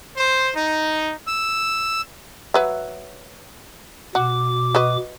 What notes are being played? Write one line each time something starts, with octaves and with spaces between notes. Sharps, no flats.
C5
D#4
E6
F#3 B4 E5
B2 F#4 D6
F#4 B4 D#5